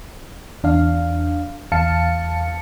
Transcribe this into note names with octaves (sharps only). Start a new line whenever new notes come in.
E2 D4 F5
E2 F5 A5 C#7